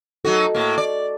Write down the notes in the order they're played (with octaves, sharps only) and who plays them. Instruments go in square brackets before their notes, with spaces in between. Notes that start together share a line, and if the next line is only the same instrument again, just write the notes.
[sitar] F#3 D#4 F#4 [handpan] A4
[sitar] A2 A#3
D5